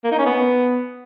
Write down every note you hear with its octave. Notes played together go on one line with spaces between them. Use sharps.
A#3
D#4
C#4
B3